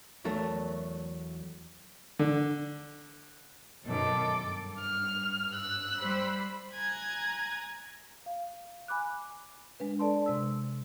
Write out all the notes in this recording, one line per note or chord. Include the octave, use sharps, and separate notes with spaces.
E2 F#3 A3 A4 A#4
D3
F#2 B2 D#3 A4 D6
G2
F6
E6 F#6
G3 C5 B5
G#5 A#5 F#6 G#6
F5
G#5 B5 D6 F#6
G#3 D4 B4
A4 D5 A5 C6
C3 G#3 E6